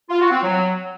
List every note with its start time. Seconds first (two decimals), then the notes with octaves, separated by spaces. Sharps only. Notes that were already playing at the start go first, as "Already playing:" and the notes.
0.10 F4
0.21 F#4
0.31 C4
0.42 F#3